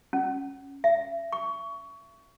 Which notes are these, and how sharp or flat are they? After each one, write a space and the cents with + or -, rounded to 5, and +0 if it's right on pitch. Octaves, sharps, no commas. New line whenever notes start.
C#4 -10
E5 +30
C#6 +20